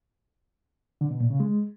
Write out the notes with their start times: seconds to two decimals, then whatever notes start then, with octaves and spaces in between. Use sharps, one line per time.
1.01 D3
1.11 B2
1.20 A#2
1.30 C#3
1.40 G#3